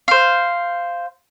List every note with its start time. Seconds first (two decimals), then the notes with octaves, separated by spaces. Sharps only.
0.08 C5 F5